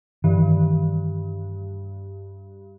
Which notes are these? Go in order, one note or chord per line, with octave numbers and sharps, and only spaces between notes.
G2 D#3 E3